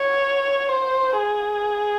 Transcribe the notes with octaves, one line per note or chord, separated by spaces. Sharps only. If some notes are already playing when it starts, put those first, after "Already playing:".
Already playing: C#5
C5
G#4